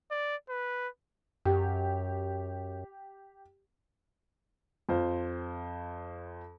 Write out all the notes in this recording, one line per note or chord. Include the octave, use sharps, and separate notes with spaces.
D5
B4
F#2 G4
F2 F4 C5